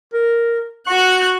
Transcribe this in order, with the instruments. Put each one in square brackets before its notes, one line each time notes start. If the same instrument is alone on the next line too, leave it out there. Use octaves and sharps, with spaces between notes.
[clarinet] A#4
[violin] F#4 F#6 [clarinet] C#6